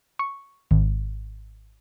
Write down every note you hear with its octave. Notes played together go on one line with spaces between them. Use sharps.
C#6
G#1